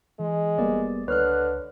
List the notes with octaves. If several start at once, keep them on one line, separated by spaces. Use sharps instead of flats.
E3 G#3
F1 G3 A#3 B3 D5
C#2 D3 B4 C#5 F6 F#6